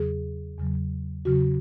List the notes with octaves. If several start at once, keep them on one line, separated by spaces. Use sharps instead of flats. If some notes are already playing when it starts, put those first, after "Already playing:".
Already playing: E2 C#3 F#3 G#4
E2 C#3 F#3
E2 C#3 F#3 F#4